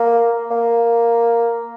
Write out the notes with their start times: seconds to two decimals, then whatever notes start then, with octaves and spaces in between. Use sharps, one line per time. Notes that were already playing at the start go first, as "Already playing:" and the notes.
Already playing: A#3
0.51 A#3